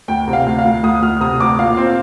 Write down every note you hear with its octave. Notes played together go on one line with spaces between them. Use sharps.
D2 G5
C3
F5
D2
F5
D2
D2 D#6
D2 F6
C3 D#6
D2 D6
A#2 F5
C4